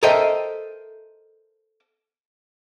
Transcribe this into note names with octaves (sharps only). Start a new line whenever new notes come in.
A4 A#4 C5 D#5 E5 G5